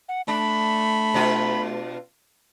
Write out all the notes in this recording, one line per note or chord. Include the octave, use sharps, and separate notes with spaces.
F#5
A3 D4 B5
B2 D4 F4